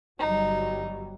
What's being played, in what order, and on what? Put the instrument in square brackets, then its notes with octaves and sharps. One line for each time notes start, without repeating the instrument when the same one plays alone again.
[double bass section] G1 F#3 G3 [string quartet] D#4